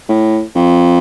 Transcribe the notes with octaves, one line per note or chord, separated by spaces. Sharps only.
A2
F2